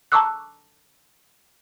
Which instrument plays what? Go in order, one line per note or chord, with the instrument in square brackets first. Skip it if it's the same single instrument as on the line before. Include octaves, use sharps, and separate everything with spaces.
[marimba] A5 A#5 C#6 D6 E6 F#6